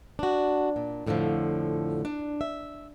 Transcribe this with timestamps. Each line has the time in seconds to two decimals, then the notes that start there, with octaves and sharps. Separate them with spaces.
0.19 D4 F#4
0.76 A#2
1.06 F2 A2 D3 E3 F3
2.05 D4
2.41 E5